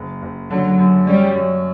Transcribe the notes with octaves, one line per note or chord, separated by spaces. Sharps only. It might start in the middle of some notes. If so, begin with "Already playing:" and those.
Already playing: F#1
F#1
D3 F#3
F#2
G3 C#4
F#2